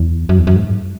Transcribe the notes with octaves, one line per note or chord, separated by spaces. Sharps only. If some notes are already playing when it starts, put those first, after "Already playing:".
Already playing: E2
F#2
E2
F#2
G#2